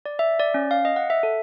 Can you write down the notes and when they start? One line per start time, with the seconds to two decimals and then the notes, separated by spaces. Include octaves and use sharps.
0.06 D5
0.19 E5
0.40 D5
0.54 C#4
0.71 F5
0.85 D#5
0.96 F#5
1.10 E5
1.23 A4